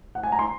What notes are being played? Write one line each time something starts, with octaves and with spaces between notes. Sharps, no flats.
F#5
G#5
A#5
C6